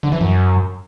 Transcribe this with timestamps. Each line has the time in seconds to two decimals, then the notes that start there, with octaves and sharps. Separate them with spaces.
0.03 D3
0.12 E3
0.21 F#2